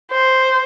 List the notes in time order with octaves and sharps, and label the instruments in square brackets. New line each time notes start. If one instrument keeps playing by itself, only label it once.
[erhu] C5